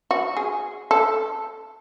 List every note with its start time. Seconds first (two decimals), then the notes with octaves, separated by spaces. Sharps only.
0.11 F#4
0.37 G#4
0.91 A4